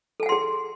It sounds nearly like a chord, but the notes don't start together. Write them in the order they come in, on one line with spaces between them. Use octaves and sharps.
A4 G#5 F#5 C6 G#4